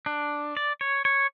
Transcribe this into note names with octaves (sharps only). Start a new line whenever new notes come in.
D4
D5
C#5
C#5